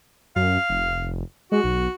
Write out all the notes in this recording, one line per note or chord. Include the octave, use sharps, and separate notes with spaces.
F#2 F5
F1
G#3 F#4
B1